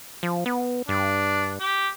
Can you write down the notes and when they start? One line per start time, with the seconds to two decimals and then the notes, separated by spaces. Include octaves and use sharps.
0.23 F3
0.46 B3
0.89 G2 D4
1.60 G4